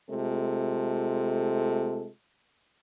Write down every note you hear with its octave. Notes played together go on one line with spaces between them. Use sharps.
C3 G#3 A3 F4 A4